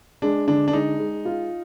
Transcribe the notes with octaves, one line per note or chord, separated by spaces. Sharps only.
G#3 D4
D3 D4
D4
G#3 D#4
G#3
F4